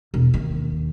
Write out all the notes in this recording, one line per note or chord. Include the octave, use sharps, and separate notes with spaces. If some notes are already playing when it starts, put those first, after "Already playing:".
E1
D#2